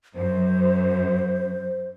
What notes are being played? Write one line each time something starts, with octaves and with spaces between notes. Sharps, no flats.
F#2 C5